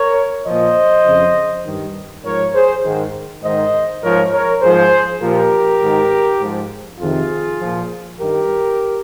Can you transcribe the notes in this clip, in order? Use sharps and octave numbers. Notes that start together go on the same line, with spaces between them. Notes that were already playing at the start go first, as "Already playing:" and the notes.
Already playing: A#4 C#5
A#2 F3 C5 D#5
F2 C#3 F3
G2 D#3
G#2 F3 A#4 C#5
G#4 C5
G#2 D#3
G#2 D#3 C5 D#5
G#2 F3 A#4 C#5
A#4 C#5
G#2 F3 G#4 C5
A#2 F3 G4 A#4
G#2 D#3
G#2 F3
F2 C3 D#3 F4 G#4
A#2 F3
G2 D#3 G4 A#4